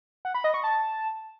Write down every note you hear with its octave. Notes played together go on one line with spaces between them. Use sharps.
F#5
B5
D#5
C#6
A5